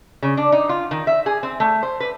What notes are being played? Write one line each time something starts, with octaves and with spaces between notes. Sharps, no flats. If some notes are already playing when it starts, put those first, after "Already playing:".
C#3
D4
D#4
F4
D#3
E5
G#4
C4
A3
C5
B4